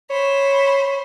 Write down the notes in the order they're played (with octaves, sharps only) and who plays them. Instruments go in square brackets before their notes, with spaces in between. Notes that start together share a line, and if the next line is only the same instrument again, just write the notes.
[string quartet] C5 B5 [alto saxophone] C#5